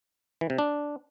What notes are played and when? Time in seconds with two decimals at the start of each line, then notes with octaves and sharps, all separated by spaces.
0.41 E3
0.50 C3
0.58 D4